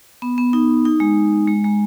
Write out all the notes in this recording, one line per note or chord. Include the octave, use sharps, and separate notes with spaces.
B3
B3
D#4
D#4
G#3
G#3
G#3